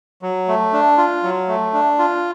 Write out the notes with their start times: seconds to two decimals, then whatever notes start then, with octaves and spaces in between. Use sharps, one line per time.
0.22 F#3
0.48 A3
0.73 D4
0.98 F4
1.23 F#3
1.48 A3
1.73 D4
1.99 F4